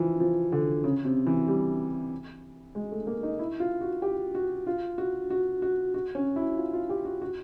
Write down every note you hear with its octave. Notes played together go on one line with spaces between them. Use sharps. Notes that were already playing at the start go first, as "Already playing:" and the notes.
Already playing: E3 F3
F3
D3
C#3
C3
E3
G3
G#3
A3
A#3
D#4
E4
F4
F#4
G4
F#4
F4
F#4
F#4
F#4
F#4
C#4
E4
F4
F4
G4
F#4
F#4